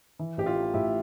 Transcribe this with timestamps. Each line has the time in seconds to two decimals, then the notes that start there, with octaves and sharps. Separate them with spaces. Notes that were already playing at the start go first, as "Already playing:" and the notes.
0.19 E3
0.38 A1 G4
0.46 F4
0.56 A3
0.74 A2 E4 G4